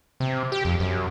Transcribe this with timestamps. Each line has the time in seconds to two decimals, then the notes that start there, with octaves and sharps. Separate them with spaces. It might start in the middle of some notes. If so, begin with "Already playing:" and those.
0.20 C3
0.52 G4
0.65 F2
0.80 F#2